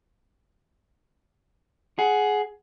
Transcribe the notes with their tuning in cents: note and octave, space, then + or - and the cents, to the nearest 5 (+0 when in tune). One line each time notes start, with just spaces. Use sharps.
G#4 +15 F#5 +0